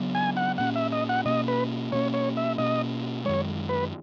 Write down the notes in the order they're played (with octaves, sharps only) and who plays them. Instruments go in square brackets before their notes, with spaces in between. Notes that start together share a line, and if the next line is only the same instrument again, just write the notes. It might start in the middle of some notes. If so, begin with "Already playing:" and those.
Already playing: [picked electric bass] C#3 F#3 B3
[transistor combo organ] G#5
F#5
[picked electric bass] A#2 A#3 C#4 [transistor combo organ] F#5
[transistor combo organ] E5
D#5
F#5
[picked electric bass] B2 A#3 C#4 [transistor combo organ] D#5
[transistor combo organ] B4
[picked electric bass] B2 A#3 C#4 [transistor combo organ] C#5
[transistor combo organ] C#5
E5
[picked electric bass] B2 A#3 C#4 [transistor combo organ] D#5
[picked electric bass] F#2 D#3 G#3 [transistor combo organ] C#5
[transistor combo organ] B4